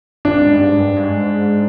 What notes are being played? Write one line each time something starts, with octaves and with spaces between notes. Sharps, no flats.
G2 D4
G#2
G2
G#2
G2
G2
G#2